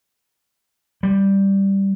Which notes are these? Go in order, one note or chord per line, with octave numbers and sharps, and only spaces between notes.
G3